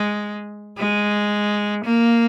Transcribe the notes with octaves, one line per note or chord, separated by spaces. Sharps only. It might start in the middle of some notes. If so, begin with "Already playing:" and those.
Already playing: G#3
G#3
A#3